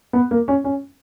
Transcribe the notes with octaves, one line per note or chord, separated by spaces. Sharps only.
B3
A#3
C#4
C#4